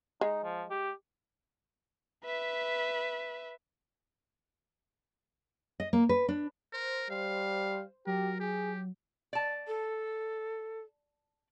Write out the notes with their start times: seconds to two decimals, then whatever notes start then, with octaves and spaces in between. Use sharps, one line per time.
0.21 G#3 D#4
0.44 F3
0.70 G4
2.25 B4 E5
5.80 D#5
5.93 A#3
6.09 B4
6.29 D4
6.73 A#4 C5
7.10 G3 F5
8.07 F#3 G4 A#4
8.40 G4 G#4
9.33 D5 A5
9.67 A4